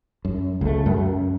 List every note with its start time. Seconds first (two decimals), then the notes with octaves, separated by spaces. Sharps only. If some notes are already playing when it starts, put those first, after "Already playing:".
0.25 F#2
0.61 C#2 A3
0.86 F#2